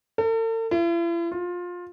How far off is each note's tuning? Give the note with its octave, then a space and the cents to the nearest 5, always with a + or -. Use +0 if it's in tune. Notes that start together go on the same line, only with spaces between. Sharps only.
A4 +45
E4 +45
F4 +20